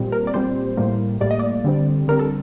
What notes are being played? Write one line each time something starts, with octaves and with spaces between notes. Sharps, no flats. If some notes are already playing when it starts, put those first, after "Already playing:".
Already playing: A#2 G3 C4
A#4
D5
A#2 G3 C4 C5
A2 G3 A#3
A2 G3 A#3 D5
D#5
D5
D3 G3 C4
D3 G3 C4 A#4
A4